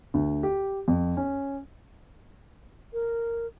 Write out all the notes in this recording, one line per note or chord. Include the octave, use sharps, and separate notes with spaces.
D2
G4
F2
C#4
A#4